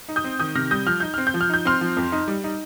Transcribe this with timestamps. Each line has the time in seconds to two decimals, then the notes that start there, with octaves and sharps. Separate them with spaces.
0.09 D#4
0.16 D#6 G6
0.24 C4
0.39 D#3 D#6 G6
0.55 C3 F6 A#6
0.71 G3 D#6 G6
0.86 F3 F6
1.00 D#4 G6
1.14 C4 F6
1.27 G6
1.34 F3
1.41 F6
1.50 D#4 G6
1.65 C4 C6 F6
1.81 F3
1.97 F2
2.12 D#4
2.28 G3
2.44 D#4